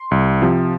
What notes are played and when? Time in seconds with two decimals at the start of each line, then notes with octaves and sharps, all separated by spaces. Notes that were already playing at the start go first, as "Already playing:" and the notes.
Already playing: C6
0.11 C2
0.42 C3 F3